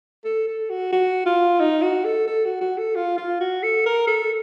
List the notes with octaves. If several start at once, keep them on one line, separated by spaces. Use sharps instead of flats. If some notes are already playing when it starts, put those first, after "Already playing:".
A4
A4
F#4
F#4
F4
D#4
F#4
A4
A4
F#4
F#4
A4
F4
F4
F#4
A4
A#4
A4